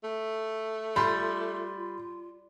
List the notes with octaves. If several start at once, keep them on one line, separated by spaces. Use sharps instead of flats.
A3
G3 F4 B5 C6